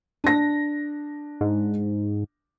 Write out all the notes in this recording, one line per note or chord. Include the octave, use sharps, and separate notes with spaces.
D4 A#6
G#2